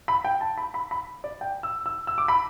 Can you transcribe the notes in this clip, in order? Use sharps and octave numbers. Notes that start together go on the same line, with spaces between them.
B5
G5
A5
B5
B5
B5
D5
G5
E6
E6
E6
D6
B5